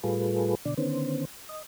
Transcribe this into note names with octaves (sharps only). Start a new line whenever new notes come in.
A2 G3 F4 G#4 A4 B4
B2 D3 D5
D3 D#3 B3 C#4 C5
D#5